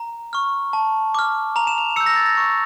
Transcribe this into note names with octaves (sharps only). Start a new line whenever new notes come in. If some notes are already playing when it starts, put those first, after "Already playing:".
Already playing: A#5
C#6 F6
A5
D6 F6
A#5 F7
E7
F7
E6 G6 C#7
A#6
A6
A#6
C#6